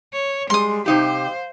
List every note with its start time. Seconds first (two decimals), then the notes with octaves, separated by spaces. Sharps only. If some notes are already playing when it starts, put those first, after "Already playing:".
0.13 C#5
0.50 G3 G#3 C6 D#6
0.86 C3 D#4 G4 C5 F5